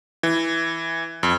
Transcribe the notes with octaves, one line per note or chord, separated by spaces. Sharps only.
E3
F2